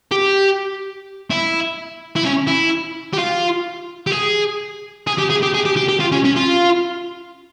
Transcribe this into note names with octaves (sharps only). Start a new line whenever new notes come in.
G4
E4
E4
C#4
E4
G4
F4
G4
G#4
G#4
G4
G#4
G4
G#4
G4
G4
G4
F4
C#4
C#4
F4